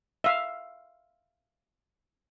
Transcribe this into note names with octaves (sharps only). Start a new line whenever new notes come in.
E5 F5